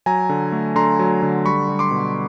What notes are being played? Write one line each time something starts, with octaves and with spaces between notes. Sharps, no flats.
F#3 G#5 A#5
D3
A3
D3 A#5 C6
F#3
D3
G3 B5 C#6
G3
C6 D6
B2